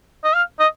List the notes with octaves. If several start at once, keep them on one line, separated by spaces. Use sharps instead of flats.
D#5
F5
D#5